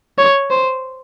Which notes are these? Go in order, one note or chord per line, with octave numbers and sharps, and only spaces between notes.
C#5
C5